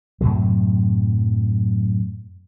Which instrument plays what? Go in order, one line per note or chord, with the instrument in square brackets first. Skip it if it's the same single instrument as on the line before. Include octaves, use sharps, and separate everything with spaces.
[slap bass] F#2 A2 C3 F#3